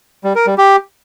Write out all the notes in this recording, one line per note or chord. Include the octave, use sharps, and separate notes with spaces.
G3
A#4
G3
G4